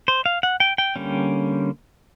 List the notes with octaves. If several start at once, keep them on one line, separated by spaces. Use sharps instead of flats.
C5
F5
F#5
G5
G5
D3 G3 A#3 C#4